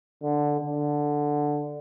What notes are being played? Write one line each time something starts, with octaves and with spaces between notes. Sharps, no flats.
D3
D3